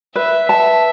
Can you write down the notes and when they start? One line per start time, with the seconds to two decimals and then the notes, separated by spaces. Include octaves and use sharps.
0.15 B4 E5
0.49 E5 A5